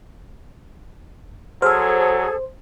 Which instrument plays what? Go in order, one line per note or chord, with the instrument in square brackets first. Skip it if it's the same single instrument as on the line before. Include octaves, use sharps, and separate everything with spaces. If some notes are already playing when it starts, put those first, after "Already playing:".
[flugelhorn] F#3 [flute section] G#4 A4 [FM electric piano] C5 [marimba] E6 F6